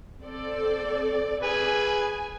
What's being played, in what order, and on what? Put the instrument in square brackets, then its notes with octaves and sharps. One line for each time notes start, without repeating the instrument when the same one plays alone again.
[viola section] C4 A4 D5
[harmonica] G#4 B4 [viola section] G#5